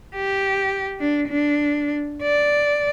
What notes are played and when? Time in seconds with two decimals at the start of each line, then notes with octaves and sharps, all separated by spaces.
0.16 G4
0.99 D4
1.29 D4
2.22 D5